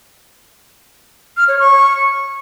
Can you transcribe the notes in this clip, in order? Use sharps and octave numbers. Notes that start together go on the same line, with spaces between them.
F6
C#5
C#6